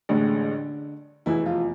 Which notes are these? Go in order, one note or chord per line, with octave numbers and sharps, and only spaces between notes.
A1 A2 D3 G#3 D4
F1 E2 B2 E3 E4
F3 F4